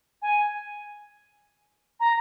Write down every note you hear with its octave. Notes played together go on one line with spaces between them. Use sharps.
G#5
A#5